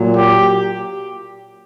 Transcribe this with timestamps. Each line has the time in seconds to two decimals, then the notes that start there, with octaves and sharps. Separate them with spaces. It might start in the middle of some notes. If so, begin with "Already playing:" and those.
Already playing: A#2 F#3
0.17 G4